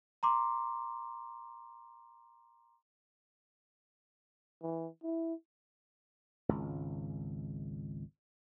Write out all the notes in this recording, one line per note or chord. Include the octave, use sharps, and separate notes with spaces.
A#5 C6 D6
E3
E4
G#1 C#2